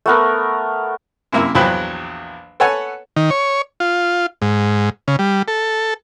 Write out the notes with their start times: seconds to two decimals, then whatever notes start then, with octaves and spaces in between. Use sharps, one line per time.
0.06 A3 B3 A#4
1.32 F#2 C3 A#3 E4
1.55 A#1 E2 F#3 C5 G5 B5
2.60 A4 B4 C#5 F#5 G#5
3.16 D#3
3.31 C#5
3.80 F4
4.42 G#2
5.08 C#3
5.19 G3
5.48 A4